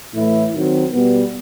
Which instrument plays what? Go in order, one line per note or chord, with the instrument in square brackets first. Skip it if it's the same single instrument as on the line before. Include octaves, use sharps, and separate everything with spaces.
[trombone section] A2 E3 A3 E4
D#3 F#3 C4
B2 G3 B3